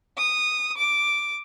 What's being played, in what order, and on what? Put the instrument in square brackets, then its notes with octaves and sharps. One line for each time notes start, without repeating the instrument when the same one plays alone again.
[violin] D#6
D6